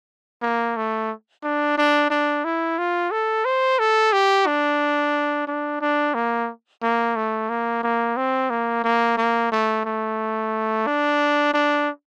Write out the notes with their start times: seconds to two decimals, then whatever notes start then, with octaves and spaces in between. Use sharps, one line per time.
0.42 A#3
0.77 A3
1.43 D4
1.78 D4
2.10 D4
2.45 E4
2.78 F4
3.11 A4
3.45 C5
3.79 A4
4.13 G4
4.47 D4
5.47 D4
5.81 D4
6.15 A#3
6.83 A#3
7.16 A3
7.49 A#3
7.83 A#3
8.17 C4
8.50 A#3
8.84 A#3
9.17 A#3
9.52 A3
9.85 A3
10.87 D4
11.54 D4